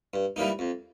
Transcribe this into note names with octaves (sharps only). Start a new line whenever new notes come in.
G2
E3 G3 A#3 D#4
F2